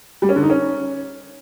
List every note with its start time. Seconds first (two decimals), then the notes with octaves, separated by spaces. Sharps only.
0.22 G3
0.29 C#4
0.36 D3
0.43 D#4
0.50 C#4